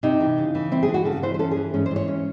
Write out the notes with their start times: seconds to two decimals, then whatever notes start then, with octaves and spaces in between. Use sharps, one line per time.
0.03 C3 D#4
0.20 E3
0.38 C#3
0.55 E3
0.72 C4 E4
0.83 G#4
0.88 E3
0.94 F#4
1.05 C#3 A4
1.23 E3 C5
1.34 C5
1.39 C#4 A4
1.51 G#4
1.56 E3
1.74 G#2 C#4
1.86 C5
1.91 E3 C#5
2.08 C#4